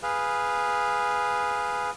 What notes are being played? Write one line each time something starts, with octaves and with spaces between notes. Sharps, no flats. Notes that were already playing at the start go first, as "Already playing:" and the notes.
G#4 B4 F5